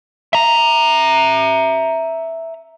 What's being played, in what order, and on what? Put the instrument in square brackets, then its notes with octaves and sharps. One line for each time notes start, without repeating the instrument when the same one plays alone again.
[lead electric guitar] E5 A#5